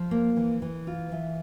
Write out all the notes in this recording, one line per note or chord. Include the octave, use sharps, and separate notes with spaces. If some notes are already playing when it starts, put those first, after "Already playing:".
Already playing: F3
A#3
E3
E3
F4
E3